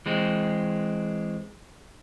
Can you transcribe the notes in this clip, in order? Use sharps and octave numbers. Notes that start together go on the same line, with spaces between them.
E3 G#3 C4